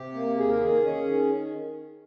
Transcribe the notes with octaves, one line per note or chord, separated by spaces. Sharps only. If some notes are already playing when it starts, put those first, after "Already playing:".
Already playing: C3 G4
A#3
D#2 G#4
A#4
D#3 G#4
C#4
D#3